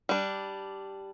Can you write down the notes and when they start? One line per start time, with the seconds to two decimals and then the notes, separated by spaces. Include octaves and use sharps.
0.09 G3 D4